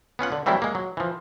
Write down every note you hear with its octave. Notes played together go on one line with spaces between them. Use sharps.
B3 C#4 F4 F#5
D3
E3 F#3 G3 A3 C4 E4
G#3 A#3
F#3
E3 F3